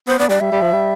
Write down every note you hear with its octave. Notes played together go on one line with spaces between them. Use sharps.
B3 C5
B3 D5
G3 D5
G3 E5
G3
F3
G3